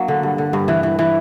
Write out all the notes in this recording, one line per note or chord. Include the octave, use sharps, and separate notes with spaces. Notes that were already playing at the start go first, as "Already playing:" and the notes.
Already playing: F#3 A#3 D4
D3
G2
D3
G2
E3
E3
E3